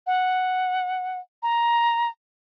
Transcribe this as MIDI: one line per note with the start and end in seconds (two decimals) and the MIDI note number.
0.07 1.19 78
1.43 2.09 82